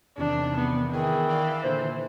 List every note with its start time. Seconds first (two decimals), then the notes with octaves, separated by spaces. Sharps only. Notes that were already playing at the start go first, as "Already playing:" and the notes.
0.17 E2 C3 D#3 D4
0.57 B3
0.93 D#3 E3 G#4
1.28 D5 F5
1.63 A#2 D3 C5